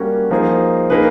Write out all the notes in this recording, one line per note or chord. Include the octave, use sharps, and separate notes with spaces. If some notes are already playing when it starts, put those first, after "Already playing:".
Already playing: G3 A#3 C#4 F#4 A#4
F3 A#3 D#4 G#4
A#3 D#4 G#4 B4